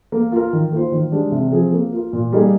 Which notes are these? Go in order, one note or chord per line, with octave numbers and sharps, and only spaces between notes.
A#3
F4 A#4
D#3
A#3 F4 C5
D#3
G#3 D4 G4
C3
F3 C4 F4 G#4
A#3
F4 A#4
A#2
G3 A#3 D#4 G#4